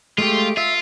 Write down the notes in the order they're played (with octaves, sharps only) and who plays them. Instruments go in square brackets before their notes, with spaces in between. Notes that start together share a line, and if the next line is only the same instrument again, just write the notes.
[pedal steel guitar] G#3 A3 G4 [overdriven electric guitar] F4
[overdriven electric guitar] F4 [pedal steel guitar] E5 E6